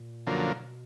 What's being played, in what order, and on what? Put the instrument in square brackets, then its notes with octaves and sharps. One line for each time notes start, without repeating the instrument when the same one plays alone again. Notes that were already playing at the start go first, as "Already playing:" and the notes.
Already playing: [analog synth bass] A#2
[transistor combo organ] F#2 D3 F3 A#3 [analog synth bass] B2